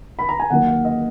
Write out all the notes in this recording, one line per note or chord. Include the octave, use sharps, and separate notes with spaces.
B5
A#5
G#5
D#2 D#3 F#3 A#3 F#5
F5
D#5